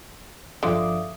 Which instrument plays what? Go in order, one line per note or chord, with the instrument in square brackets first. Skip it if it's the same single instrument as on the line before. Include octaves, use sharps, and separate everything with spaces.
[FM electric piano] G1 F3 D6 [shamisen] D3 [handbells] E5 F5 D#6